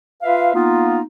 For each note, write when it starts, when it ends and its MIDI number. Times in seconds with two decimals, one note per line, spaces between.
0.22 0.53 65
0.22 0.53 71
0.22 0.53 76
0.22 0.53 77
0.54 1.01 58
0.54 1.01 59
0.54 1.01 63
0.54 1.01 65